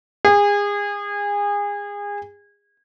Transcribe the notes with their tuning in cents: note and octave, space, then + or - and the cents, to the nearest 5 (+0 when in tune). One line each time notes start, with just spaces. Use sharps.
G#4 -30